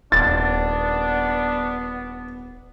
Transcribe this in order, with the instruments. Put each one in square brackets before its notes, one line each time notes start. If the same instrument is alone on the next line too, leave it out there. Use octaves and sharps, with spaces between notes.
[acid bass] D#1 [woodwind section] B3 [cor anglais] D4 [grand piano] A6